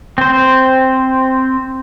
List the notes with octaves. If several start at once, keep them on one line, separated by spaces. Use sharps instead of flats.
C4 C5